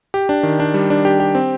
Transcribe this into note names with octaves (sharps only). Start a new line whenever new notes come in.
G4
D4
D#3
D4
G3
D4
G4
G4
C4